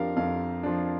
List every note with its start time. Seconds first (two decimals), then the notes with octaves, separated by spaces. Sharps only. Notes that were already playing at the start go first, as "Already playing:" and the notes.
Already playing: F2 F3 D4 G4 A#4 F5
0.16 F2 F5
0.63 F3 D4